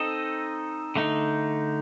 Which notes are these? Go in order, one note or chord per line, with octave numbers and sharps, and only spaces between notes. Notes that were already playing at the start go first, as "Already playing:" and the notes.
Already playing: C4 D#4 A4 D#5
D3 A3 D#4